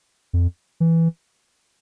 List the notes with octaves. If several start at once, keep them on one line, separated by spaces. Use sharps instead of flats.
F2
E3